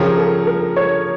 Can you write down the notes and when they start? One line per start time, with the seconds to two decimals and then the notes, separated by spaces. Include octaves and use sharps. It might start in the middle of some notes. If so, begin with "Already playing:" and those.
Already playing: C#3 F3 C#4 G4 A#4
0.18 A4
0.47 A#4
0.76 C#5